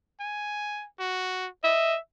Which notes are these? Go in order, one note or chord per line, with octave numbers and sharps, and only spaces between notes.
G#5
F#4
D#5 E5